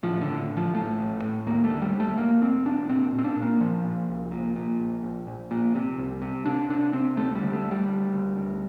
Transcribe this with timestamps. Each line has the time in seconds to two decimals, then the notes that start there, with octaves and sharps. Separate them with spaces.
0.03 A2 F3
0.21 D3
0.27 A2
0.51 A1
0.57 F3
0.74 A2 A3
0.98 A1
1.22 A2
1.47 D#2 A#3
1.64 A3
1.70 D3
1.82 G3
1.93 F1
2.00 A3
2.17 F1 A#3
2.41 F1 C4
2.65 F1 D4
2.89 A#2 C4
3.13 A#2
3.19 C4
3.24 D4
3.37 A#2
3.42 A#3
3.60 A#2 F3
3.84 A#2
4.08 C2
4.31 A#2
4.56 A#2
4.80 A#1
5.03 A#1
5.27 A#1
5.51 A#2
5.75 C3
5.98 C2
6.22 C3
6.46 C3 D4
6.69 C3 D4
6.93 C3 C4
7.17 D2 A3
7.35 G3
7.41 D3
7.53 A3
7.65 D2
7.71 G3
7.89 D2
8.13 D2
8.36 D2